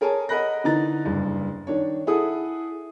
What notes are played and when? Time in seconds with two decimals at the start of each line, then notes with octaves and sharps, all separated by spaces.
0.01 G#4 A#4 C#5 G#5 A5
0.29 A#4 D#5 F#5 B5 F#6 A#6
0.64 D3 E3 D#4 A#5 A6
1.05 F#1 G2
1.67 D#3 D4 C#5
2.07 E4 G#4 A4 F#5 D#6